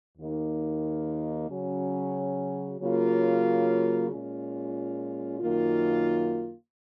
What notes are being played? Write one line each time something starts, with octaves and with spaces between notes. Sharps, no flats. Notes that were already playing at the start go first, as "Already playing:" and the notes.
D#2 D#3 A#3 D#4
C#3 F#3 C#4
C#3 F#3 A#3 F4
A#2 G#3 C#4 F4
F#2 D#3 A#3 F4